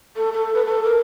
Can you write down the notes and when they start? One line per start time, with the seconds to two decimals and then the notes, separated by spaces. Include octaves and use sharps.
0.17 A4
0.33 A4
0.54 B4
0.66 A4
0.84 A#4